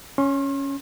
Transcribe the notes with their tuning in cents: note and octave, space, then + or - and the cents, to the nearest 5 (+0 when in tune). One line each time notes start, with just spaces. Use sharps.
C#4 +0 C6 +45